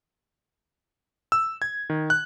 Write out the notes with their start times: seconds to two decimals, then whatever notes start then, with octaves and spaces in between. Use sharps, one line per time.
1.32 E6
1.62 G#6
1.90 D#3
2.10 F#6